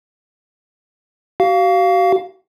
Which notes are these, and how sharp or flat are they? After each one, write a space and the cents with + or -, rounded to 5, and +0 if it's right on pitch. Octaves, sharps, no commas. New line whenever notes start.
F#4 +40 F5 +0